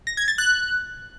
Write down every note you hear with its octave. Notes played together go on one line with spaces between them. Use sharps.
A#6
G#6
A6
F#6